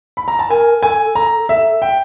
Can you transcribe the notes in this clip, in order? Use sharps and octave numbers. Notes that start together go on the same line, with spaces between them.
B5
A#5
A5
A#4 G#5
A4 G#5
A4 A#5
A4 E5
G5